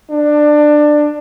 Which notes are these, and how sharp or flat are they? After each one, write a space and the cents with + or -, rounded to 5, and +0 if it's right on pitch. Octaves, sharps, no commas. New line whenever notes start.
D4 +20